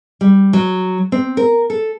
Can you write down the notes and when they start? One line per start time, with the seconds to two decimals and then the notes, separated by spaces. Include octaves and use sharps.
0.21 G3
0.53 F#3
1.12 C4
1.37 A#4
1.70 A4